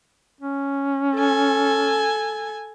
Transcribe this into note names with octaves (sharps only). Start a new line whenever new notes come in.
C#4
A4 G#5